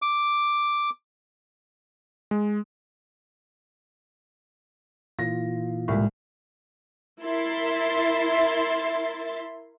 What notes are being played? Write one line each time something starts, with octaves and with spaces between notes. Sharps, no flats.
D6
G#3
A#2 E3 F4 A#6
C2 A2 G#3
E4 A#4 E5 C6 A6